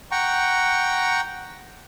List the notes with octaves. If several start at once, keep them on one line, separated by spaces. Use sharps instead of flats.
F#5 G5 A#5 C#6